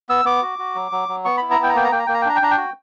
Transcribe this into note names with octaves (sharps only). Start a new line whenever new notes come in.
B3 E6
B3 D6
F#4
F#4
F#3
F#3
F#3
B3 C#6
E4 B5
A#5
B3 G5
A#5
A#3 G5
A#5
A#3 G5
A#5
A#3 G5
A#5
G5
D4 A#5
G5
D4 A#5
G5
F#4